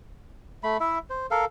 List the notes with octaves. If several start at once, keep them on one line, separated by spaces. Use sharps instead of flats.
A3 B5
E4 E5
C5
A4 A#4 F5